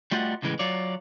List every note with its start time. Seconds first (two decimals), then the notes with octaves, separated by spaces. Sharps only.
0.11 G3 A3 F4 F#4 D#5 F#5
0.42 C#2 A2 C#3 E3 G#3
0.59 F#3 F4 C#5 D5